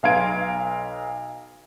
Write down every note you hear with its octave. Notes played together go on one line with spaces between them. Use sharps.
B1 B4 F5 C6 G#6 D7